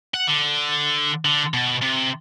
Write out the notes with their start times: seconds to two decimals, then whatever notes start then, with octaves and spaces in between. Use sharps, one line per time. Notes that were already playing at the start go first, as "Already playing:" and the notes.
0.14 F#5
0.27 D3
1.25 D3
1.54 B2
1.82 C3